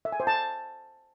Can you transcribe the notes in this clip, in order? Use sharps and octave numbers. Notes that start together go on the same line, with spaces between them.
E5
G#5
C5
A5